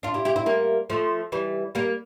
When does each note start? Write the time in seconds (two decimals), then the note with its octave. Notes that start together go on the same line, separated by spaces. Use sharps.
0.03 D4 F4
0.14 E4 G4
0.25 E4 G4
0.36 C4 E4
0.46 G3 A#3
0.90 F3 A3
1.32 E3 G3
1.75 G3 A#3